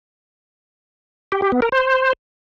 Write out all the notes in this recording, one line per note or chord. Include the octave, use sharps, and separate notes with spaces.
G4
G4
B3
A#4
C5